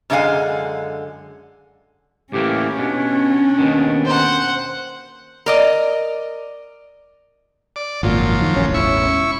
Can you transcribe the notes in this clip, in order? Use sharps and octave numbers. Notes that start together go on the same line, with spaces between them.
F#2 D3 G#3 D4 F5 G#5
A2 E3 A#3 C#4 G4
B2 D4
D#2 B2 D#3
C5 F#5
A#4 D5 D#5
D5
G#1 F#2 A#2 F3
D#3
E1 A1 C#4
E4 C#6